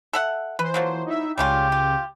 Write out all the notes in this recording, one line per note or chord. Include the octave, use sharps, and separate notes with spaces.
A4 E5 F#5
E3 B4 C5
F3 F#3 A#3
D#4 E4 E5
C#2 C#3 G3 C#4 F4 G4
F4